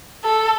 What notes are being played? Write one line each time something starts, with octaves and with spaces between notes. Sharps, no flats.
A4